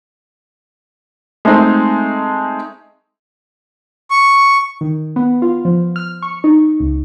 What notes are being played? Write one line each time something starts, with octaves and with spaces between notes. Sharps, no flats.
G#3 A3 C4 D#4
C#6
D#3
B3
F4
F3
F6
C#6
D#4
C#2